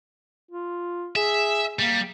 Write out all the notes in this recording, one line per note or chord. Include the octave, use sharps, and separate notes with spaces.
F4
G#4 E5
G3 A#3